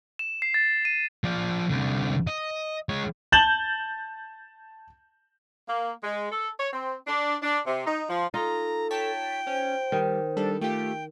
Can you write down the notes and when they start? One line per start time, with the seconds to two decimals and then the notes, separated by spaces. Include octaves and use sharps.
0.19 E7
0.42 C7
0.54 A6
0.85 D#7
1.24 F3 D5
1.70 C2 D3
2.27 D#5
2.89 G#3 C#5
3.32 A5 G6 A6 E7 F#7 G7
5.68 A#3
6.04 G#3
6.32 A4
6.59 C#5
6.73 C4
7.07 D4
7.43 D4
7.67 C3
7.87 D#4
8.09 F3
8.34 D#4 F4 A4 A#5
8.91 C#5 G5 A5 B6
9.47 C#4 C5
9.92 D#3 G3
10.36 G3 D4 A4
10.61 A3 F4 G4 G5